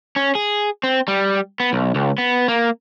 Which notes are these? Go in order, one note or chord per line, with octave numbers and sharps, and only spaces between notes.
C#4
G#4
C4
G3
B3
B1
C#2
B3
A#3